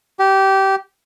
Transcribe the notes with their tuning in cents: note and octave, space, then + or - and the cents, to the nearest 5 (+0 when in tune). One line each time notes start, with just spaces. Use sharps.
G4 -20